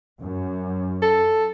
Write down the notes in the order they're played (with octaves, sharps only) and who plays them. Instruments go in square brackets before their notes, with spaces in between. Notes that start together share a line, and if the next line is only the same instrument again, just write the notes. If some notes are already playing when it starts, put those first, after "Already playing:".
[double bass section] F#2
[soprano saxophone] A4